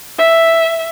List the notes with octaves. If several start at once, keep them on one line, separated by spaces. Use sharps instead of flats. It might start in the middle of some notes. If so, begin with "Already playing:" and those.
E5